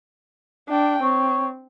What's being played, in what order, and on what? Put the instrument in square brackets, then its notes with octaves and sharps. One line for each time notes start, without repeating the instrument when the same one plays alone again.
[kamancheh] D4 G5
[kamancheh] C4 [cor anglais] C#5